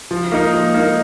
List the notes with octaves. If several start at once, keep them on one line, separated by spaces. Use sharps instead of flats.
F3
A#3 D#4 A#4
F3
A#3 D#4 A#4